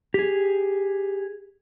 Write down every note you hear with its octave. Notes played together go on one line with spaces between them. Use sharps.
G4 G#4